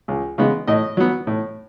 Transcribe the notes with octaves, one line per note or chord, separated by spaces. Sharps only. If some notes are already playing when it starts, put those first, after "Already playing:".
C#2
C#3 G#3 B3
A2 D#5
F#3 B3
A2